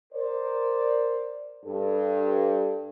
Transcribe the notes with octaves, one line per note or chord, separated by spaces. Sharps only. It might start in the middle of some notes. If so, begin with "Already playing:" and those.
A#4 C5 D5
G2 A4